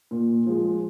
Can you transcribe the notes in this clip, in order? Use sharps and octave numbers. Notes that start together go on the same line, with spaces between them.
A#2
F3 G#3